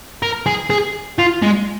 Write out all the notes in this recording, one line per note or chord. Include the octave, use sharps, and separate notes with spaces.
A#4
G#4
G#4
F4
G#3